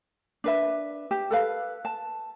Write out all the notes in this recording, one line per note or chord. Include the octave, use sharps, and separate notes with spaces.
D4 B4 E5
G4
A4 B4 F5
A5